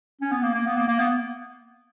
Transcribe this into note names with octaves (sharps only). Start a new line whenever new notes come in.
C#4
B3
A#3
A#3
B3
A#3
A#3
B3